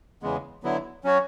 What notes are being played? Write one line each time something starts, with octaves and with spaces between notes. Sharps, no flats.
E2 C#3 E3 G#3 B3
D3 F#3 B3 E4
F#3 C#4 F#4 C#5